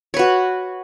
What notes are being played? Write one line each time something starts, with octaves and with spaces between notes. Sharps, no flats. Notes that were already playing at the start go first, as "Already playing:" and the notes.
F#4 B4 C#5